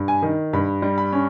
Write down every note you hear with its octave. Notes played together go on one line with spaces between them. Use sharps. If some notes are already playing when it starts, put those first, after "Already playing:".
Already playing: G2
G#5
D#3
G2 B5
G3
B5
C#4